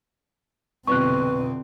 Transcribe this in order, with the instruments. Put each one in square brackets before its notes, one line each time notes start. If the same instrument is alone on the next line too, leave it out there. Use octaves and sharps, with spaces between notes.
[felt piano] C2 F2 B2 [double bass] D3 C4 [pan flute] B4 [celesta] C#6 F#6